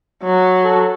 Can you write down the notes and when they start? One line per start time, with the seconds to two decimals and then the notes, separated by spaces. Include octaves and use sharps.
0.23 F#3
0.64 A4